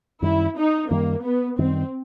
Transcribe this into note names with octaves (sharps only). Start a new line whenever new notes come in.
F#2 D#3 G3 E4
D#4
F#2 D#3 G3 A#3
B3
F#2 D#3 G3 C4